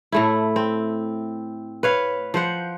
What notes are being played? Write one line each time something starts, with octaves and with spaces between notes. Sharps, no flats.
A2 A3 E4
C4
B4 C#5 F5
F3 C5 F#5